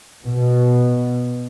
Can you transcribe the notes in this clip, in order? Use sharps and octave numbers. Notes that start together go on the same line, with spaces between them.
B2